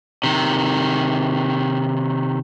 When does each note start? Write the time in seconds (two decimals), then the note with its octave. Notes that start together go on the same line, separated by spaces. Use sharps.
0.24 C3 D#3